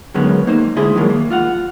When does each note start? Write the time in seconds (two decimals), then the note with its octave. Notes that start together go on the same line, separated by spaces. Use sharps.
0.14 D3 D#3 F#3 G#3 B3 C#4
0.47 A#3 D#4 C5
0.76 D2 G#2 D3 E4 G#4 C6
0.96 D#3 F3 F#3 G#3 A#3
1.10 A#3
1.31 F4 F5 F#5